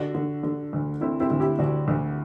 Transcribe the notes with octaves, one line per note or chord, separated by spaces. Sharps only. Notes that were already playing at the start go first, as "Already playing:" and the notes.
Already playing: D3 D4 F#4
D3
D3
D2
D3 C4 E4
C4 E4
D2
E4 G4
D2 D4 F#4
D2